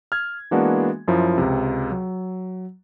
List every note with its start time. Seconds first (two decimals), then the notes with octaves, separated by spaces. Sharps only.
0.12 F6 G#6
0.51 E3 G#3 A#3 B3 D4 F#4
1.08 F#2 F3 E4
1.38 C#2 C3
1.91 F#3